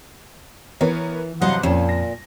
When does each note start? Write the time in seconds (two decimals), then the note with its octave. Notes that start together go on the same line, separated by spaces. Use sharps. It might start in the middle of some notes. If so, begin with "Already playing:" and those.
0.81 E3 B3 A#4 C#5
1.42 E2 G2 C3 F#3 C5 D#5 F5 F#5
1.63 F2 A#2 C4 C#4 E7
1.89 A#6